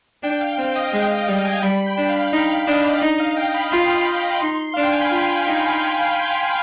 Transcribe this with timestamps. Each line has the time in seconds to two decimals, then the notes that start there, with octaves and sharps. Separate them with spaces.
0.23 D4 G5
0.41 F5
0.58 C4 F5
0.75 D#5
0.92 G#3 D#5
1.10 F5
1.27 G3 G5
1.45 G#5
1.62 G3 B5
1.86 G5
1.97 D4
2.09 F5
2.31 D#4 G5
2.49 F5
2.67 D4 D#5
2.84 D5
3.01 D#4 D#5
3.20 F5
3.37 G5
3.54 B5
3.72 F4 C6
4.41 D#4
4.74 D4 F5
4.83 G5
4.92 G#5
5.01 B5
5.11 F4 C6
5.46 D#4 C6